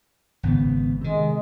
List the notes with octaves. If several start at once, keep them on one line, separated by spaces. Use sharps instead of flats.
G#1 C#3 B3
C3 D#3 G#3